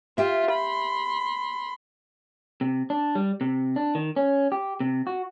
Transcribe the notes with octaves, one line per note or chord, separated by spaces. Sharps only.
F4 G4 E5
B5 C6
C3
D4
G3
C3
D4
D#3
C#4
G4
C3
F#4